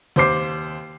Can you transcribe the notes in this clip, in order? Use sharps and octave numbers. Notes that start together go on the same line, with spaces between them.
D#2 C5 D6 C7